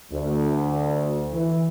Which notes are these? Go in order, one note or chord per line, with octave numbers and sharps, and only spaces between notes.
D2
E3